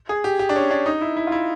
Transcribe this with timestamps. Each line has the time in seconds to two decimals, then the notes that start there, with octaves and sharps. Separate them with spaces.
0.09 G#4
0.24 G4
0.39 G4
0.49 D4
0.56 C#4
0.71 D4
0.86 D#4
1.01 E4
1.17 E4
1.27 F4
1.32 E4